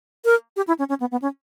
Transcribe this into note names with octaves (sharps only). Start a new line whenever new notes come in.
A#4
G4
E4
C#4
C#4
B3
B3
C#4